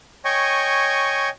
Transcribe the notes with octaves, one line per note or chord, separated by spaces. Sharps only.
C#5 D#5 G5 G#5 C#6